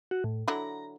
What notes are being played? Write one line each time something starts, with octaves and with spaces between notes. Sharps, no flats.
F#4
A2
D3 F#3 E4 A#5